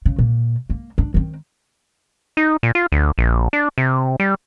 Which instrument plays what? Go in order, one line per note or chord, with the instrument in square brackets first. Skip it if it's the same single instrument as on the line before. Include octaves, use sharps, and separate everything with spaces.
[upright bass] C#3
A#2
A#3
D4
D#3 C4
[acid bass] D#4
A#2
F4
D2
A#1
D4
C3
G3